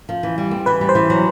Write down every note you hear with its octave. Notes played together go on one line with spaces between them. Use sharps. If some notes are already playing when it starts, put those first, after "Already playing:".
F3
E3
G3
C4
E3 B4
G3
C5
E3
F#3